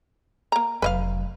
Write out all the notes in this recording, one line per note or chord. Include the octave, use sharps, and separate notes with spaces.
A#3 A#5
F1 F#3 B4 D#5 F5